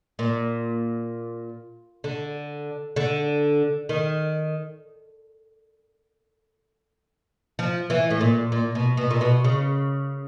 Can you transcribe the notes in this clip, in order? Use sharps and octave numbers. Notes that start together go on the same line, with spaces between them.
A#2
D3
D3
D#3
F3
E3
A2
A#2
A#2
B2
B2
A#2
B2
C#3